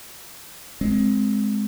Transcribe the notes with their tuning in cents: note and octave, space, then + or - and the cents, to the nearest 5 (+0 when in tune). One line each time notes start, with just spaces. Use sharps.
G#3 +15 C4 +0